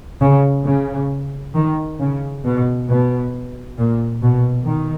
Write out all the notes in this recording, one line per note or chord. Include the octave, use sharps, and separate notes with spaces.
C#3
C#3
D#3
C#3
B2
B2
A#2
B2
D#3